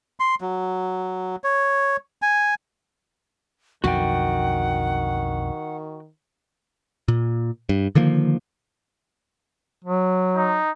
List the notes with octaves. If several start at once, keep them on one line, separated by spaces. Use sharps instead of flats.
C6
F#3
C#5
G#5
B1 F2 D3 D#3 F#4 F#5 G5
A#2
G2
D3 D#3 F3 A#3
F#3
D#4